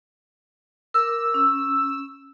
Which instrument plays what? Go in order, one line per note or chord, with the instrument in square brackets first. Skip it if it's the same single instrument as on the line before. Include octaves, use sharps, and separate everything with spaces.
[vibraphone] A#4 D6 [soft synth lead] E6
[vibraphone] C#4